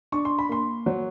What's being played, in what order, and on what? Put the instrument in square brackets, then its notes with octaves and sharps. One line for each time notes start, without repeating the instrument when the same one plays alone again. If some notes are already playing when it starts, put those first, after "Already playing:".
[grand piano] D4 C#6
C6
B5
A#3 C6
F#3